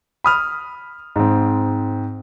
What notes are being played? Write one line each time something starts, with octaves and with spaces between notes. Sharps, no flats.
B5 D#6 F6
G#2 C4